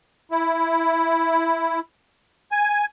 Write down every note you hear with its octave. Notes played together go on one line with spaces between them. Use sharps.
E4
G#5